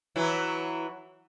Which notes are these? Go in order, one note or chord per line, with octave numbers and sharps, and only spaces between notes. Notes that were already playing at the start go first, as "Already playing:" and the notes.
E3 F#3 E4